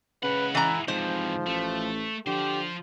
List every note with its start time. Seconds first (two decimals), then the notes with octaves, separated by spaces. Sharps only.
0.23 C#3 G#3 B4 F#5
0.55 E3 E4 A#5
0.88 G#2 C3 E3 F3 C5
1.46 A1 A3
2.27 D3 F3 G4 C5